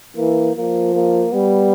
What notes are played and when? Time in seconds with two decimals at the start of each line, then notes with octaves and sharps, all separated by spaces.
0.17 E3 A#3
0.56 F3 A#3
0.95 A#3
1.32 G3 B3